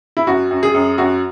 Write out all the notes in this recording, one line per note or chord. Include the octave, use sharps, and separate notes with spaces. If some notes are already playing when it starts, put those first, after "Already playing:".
E4
F#2 F#4
F#2
G#4
F#2
F#2 F#4